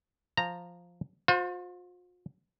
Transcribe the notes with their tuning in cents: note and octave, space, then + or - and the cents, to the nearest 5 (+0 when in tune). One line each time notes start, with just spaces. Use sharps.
F3 +0 A#5 -10
F4 +45 C5 +0